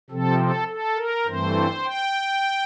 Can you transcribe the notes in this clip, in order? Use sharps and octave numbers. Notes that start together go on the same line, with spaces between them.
C3 F3 C4 A4
A4
A4
A#4
G2 E3 A3 C4 C5
G5